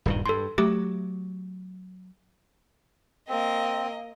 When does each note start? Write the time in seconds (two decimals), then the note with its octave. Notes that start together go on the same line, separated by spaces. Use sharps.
0.06 D#1 G2 D#3
0.26 G2 A4 C6
0.58 F#3 A3 G4 D6
3.29 A#3 C4 D#5